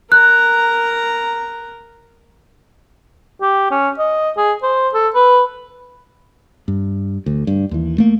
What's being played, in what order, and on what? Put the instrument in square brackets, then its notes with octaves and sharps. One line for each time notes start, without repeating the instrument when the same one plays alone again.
[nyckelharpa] A#4 A#5 [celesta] F#6
[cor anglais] G4
C#4
D#5
G#4
C5
A4
B4
[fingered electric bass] G2
D2
G2
D#2 E3
A3 A#3